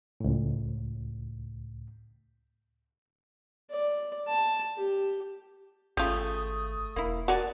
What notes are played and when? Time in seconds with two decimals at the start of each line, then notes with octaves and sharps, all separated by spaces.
0.20 C#2 A2
3.71 D5
4.28 A5
4.77 G4
5.97 G#1 A3 C#4 F4 G4 G#4 D#6
6.96 E1 A#3 E4
7.28 F#4 A#4 D5 F#5 G#5 A5